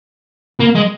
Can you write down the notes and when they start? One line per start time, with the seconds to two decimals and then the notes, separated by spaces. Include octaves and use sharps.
0.60 A#3
0.75 G#3